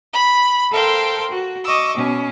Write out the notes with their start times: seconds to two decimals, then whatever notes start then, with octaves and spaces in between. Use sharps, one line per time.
0.13 B5
0.71 A4 A#4 C5 F5 G5 C6
1.30 F#4
1.64 D#5 C#6 D6 E6
1.95 B2 C#4